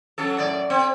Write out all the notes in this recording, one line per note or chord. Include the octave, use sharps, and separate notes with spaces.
F#3 C#4 A4
F#2 A2 D5
C4